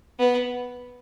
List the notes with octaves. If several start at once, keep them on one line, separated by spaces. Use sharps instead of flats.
B3